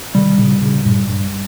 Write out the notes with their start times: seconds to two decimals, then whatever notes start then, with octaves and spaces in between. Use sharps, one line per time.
0.15 C3 D#3 G3
0.38 A#2 C#3
0.62 A#2 C#3
0.85 G2 A#2
1.09 G2